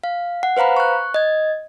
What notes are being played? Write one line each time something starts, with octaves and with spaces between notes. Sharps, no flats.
F5
F#5
B4 C5 F5 A#5 B5
C#6 F#6
D#5 G#6